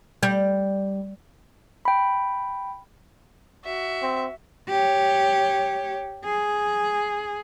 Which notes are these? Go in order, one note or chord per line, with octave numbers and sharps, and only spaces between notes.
G3
G5 B5
F#4 E5
C4
G4 C#5
G#4